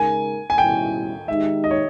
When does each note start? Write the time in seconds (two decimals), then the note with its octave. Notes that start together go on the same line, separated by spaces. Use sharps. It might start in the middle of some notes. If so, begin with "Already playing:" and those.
Already playing: C#3 G#3 D#4 A#4 G#5
0.50 G#5
0.58 B2 G3 C#4 E4 G5
1.28 D#3 G#3 D#4 G4 E5
1.64 D#5
1.71 C#5